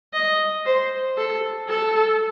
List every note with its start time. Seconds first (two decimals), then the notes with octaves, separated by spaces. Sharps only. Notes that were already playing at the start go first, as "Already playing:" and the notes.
0.13 D#5
0.66 C5
1.17 A4
1.69 A4